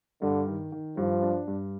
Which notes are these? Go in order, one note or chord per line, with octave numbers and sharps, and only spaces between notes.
G2 D3
D#3
D#3
G2 F3
D4
G2